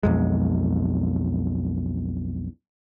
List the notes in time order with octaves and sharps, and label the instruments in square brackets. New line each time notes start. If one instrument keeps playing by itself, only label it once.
[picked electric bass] B1 F2 G#3